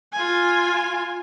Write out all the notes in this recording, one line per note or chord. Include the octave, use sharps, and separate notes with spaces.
F4 G#5